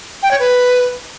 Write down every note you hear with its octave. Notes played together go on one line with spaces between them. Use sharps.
G5
C#5
B4